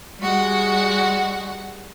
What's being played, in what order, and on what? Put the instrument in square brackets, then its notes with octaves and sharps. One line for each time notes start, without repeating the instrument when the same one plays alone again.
[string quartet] G3 G#3 F#4 F#5